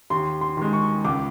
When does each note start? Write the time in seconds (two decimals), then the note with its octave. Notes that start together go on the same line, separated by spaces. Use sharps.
0.10 D#2 C6
0.41 C6
0.57 D#3 G#3
0.73 C#6
1.04 C#2 D6